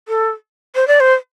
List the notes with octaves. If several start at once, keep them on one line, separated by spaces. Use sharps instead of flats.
A4
C5
D5
C5